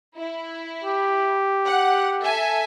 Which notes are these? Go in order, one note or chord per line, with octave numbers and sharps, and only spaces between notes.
E4
G4
F#5
A4 E5 G#5